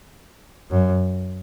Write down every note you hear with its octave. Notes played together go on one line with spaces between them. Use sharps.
F#2